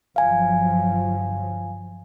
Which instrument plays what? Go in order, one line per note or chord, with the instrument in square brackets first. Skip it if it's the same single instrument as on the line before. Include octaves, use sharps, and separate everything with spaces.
[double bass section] G1 F3 F#3 [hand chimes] F5 G#5